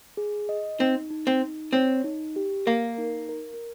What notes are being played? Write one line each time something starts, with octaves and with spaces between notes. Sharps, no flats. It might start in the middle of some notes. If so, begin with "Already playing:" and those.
G#4
D#5
C4 D#4
D#4
C4
D#4
C4 C#5
D#4
G4
A#3 A#4
D#4
A#4